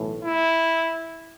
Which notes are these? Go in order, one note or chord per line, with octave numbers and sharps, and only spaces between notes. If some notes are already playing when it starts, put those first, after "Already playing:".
Already playing: B1 A2 E3
E4